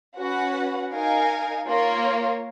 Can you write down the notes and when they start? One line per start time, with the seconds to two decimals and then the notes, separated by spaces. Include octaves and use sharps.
0.18 C#4 F#4 B4 F#5
0.93 D#4 A#4 F5 G#5
1.67 A#3 F4 A#4 C#5